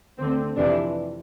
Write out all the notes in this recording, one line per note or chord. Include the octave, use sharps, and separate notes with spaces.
D2 D3 C4
F2 C3 E3 D4